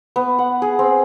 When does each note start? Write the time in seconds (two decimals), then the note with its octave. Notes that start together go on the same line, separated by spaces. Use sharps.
0.16 B3
0.39 F#5
0.62 G#4
0.79 C4